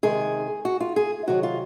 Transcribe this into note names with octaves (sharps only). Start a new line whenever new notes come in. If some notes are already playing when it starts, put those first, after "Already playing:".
C3 D#3 G#3 G#4
F#4
F4
G#4
C3 D#3 F#3 F#4
F4